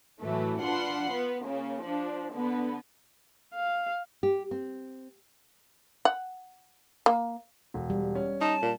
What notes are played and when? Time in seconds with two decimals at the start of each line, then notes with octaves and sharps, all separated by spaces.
0.22 A2 E3 F#3 A3
0.61 D4 F4 B4 F#5 C6
1.12 B3
1.44 C#3 A#3
1.83 F3 D4
2.34 D3 B3
3.54 F5
4.23 G4
4.51 C4
6.05 F#5
7.06 A#3
7.74 E1
7.90 G3
8.15 C#4
8.41 D#4 A5
8.62 A#2